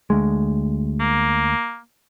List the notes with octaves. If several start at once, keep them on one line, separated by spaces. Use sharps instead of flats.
D2 G#3
A#3